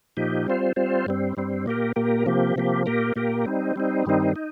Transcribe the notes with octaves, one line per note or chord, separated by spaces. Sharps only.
A#2 F3 D#4 G4
G3 C4 F4 C5
G3 C4 F4 C5
G2 G3 C4
G2 G3 C4
A#2 A#3 G4 A#4
A#2 A#3 G4 A#4
C3 F3 A#3 G4
C3 F3 A#3 G4
A#2 A#3 G4 A#4
A#2 A#3 G4 A#4
G3 C4 D#4
G3 C4 D#4
G2 D#3 G3 C4 D#4
D#4